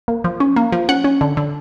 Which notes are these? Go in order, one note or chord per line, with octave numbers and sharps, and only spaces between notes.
A#3
F3
C#4
A#3
F3
C#4 F#5
C#4
D3
D3